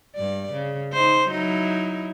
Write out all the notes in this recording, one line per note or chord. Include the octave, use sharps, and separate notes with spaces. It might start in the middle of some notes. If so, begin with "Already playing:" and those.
G2 D5
C#3
D#4 C5
F#3 D#4 E4